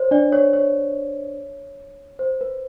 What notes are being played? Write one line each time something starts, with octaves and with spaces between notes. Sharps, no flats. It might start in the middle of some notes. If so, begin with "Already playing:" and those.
Already playing: C5 C#5
D4 D5
C#5
C#5
C5
B4